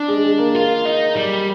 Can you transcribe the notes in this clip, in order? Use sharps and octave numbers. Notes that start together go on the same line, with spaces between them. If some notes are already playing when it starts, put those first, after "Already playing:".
Already playing: D4
G#3
G#3
A#3
F4
D#4
G3